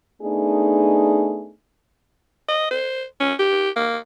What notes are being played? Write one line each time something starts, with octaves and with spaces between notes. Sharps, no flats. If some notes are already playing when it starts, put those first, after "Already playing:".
A3 B3 D4 D#4 G#4
D#5
C5
C#4
G4
A#3